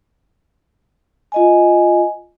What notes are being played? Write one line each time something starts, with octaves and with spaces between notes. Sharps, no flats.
F4 D#5 G#5